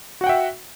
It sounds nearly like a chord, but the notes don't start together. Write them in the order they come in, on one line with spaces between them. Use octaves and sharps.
F#4 F#5 G5 E5